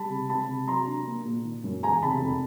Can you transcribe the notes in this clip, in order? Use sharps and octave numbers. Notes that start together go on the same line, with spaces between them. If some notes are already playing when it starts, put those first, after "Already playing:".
Already playing: G3 A5 B5
C3
C3 A5 B5
C3
F#3 A#5 C6
D4
A#3
A#2
D#3
F#2
E2 G#5 A#5
C3 A5 B5
F2